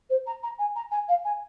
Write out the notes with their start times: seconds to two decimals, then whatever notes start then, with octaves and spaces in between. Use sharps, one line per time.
0.09 C5
0.26 A#5
0.43 A#5
0.59 G#5
0.75 A#5
0.91 G#5
1.08 F5
1.24 G#5